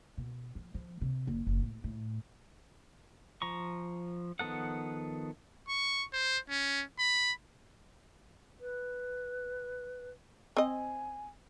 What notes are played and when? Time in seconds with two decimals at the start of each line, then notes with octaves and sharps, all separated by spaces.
0.18 B2
0.55 F3
0.74 F3
1.01 C3
1.27 F#1
1.47 F#1
1.62 A2
1.84 A2
3.42 F3 A#5 C#6
4.39 D#3 F3 B3 A4 F#5
5.68 C#6
6.13 C5
6.49 C#4
6.99 B5
8.60 B4
10.57 C4 D#5 G#5